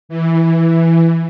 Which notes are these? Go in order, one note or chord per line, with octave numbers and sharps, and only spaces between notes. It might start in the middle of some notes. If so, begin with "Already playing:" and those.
E3